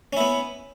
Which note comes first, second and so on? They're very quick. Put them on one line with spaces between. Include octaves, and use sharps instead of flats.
C#4 E4 B3